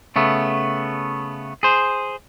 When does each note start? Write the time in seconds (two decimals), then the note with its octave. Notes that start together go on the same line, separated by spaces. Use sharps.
0.16 C#3 A3 B3
1.63 G#4 C5